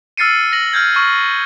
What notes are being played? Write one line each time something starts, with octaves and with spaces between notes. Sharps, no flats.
E6 F6 A6 C7 C#7 D#7
A#6 F#7
F6 G6 G#6
C#6 F6